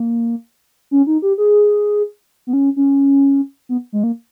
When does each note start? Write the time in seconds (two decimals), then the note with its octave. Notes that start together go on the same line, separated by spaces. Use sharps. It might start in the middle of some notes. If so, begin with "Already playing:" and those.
Already playing: A#3
0.91 C#4
1.07 D#4
1.22 G4
1.38 G#4
2.47 B3
2.53 C#4
2.76 C#4
3.69 B3
3.93 G#3
4.04 A#3